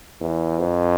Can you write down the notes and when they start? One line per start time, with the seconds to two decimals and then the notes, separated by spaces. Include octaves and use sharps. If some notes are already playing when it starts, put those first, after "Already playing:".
0.21 E2
0.59 F2